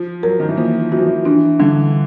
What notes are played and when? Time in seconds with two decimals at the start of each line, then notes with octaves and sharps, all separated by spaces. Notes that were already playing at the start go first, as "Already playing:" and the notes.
Already playing: F3
0.23 F#3 A#4
0.40 D#3
0.49 E3
0.57 F3 A#3
0.92 E3 F#4
0.99 F3
1.06 E3
1.25 E3 D4
1.59 D3 G3